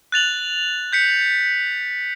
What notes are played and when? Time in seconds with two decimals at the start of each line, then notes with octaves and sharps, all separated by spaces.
0.12 F#6 A6 F7 F#7
0.93 G6 B6 C#7